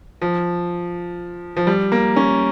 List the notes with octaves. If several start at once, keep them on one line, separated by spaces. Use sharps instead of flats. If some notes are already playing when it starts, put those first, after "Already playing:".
F3
F3
G3
A#3
C#4